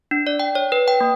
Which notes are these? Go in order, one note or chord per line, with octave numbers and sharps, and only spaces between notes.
D4
D5
G5
C#5
B4
G5
A#3